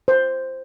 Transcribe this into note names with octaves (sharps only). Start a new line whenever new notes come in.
C5